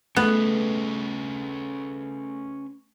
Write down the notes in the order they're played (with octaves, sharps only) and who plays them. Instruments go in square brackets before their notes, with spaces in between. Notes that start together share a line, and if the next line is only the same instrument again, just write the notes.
[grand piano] A3 [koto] B3 [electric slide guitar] C#4 G#4 B4